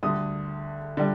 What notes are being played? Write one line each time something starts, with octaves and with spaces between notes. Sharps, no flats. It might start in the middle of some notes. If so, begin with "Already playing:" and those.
D2 D3 G3 D#6
D3 G3